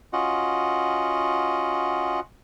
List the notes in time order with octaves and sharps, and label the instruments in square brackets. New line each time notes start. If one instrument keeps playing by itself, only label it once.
[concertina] C#4 F4 F#4 D#5 F#5